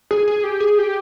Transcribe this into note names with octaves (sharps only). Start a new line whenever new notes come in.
G#4
G#4
G4
G#4
G4